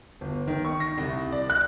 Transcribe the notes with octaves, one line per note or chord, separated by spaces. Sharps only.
G1
D#3
C#6
A#6
C2
D5
F#6